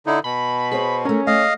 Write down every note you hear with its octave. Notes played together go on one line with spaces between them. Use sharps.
D3 D#4 E4
B2 B5
G#4 C5 C#5 B5
A3 C#4 A#4
A3 D#5 F5